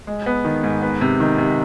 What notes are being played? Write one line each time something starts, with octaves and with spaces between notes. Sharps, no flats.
G#3
B3
D#3
G#2
B3
C3
D#3
C3